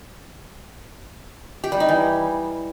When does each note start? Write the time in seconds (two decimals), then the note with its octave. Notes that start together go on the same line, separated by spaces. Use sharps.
1.64 G4
1.72 G3
1.80 D#4
1.89 E3